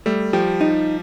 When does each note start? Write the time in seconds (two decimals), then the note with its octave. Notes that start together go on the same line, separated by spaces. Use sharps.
0.06 G3 A3
0.33 F3 G4
0.61 D#4